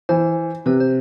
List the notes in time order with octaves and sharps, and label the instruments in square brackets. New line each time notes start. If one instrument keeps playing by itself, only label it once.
[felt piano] E3 [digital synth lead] C5
[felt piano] C3 [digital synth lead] B4
[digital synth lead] C5